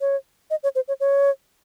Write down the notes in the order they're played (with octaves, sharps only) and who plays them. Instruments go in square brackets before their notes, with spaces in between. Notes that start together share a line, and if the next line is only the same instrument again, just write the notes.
[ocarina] C#5
D#5
C#5
C5
C#5
C#5